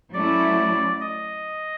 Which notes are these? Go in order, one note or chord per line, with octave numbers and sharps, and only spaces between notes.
F#3 A3 C#4 E4 D5
D#5